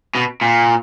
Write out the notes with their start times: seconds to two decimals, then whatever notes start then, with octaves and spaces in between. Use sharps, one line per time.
0.15 B2
0.41 A#2